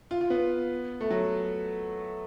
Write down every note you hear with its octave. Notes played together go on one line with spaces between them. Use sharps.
F4
F4
B3
A3
F#3